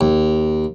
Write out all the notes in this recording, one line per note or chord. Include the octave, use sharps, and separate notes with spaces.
D#2